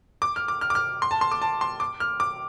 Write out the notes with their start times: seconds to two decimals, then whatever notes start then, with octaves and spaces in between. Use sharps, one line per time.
0.22 D6
0.36 F6
0.48 D6
0.61 F6
0.70 D6
0.75 F6
1.02 C6
1.11 A5
1.21 C6
1.31 D6
1.42 A5
1.61 C6
1.80 D6
2.00 F6
2.20 D6